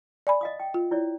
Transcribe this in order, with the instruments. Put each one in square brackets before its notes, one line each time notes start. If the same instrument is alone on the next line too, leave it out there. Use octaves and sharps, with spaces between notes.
[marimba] D5 G#5 B5
[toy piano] D#5 F5 D#6
G5
[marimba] F4
[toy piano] E4 C#5 D5